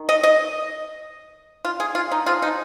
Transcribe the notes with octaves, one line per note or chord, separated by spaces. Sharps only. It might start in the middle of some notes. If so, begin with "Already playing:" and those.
Already playing: D#3
D#5
D#5
F4
G#4
F4
D#4
F3 G#3 C4 F4
D#4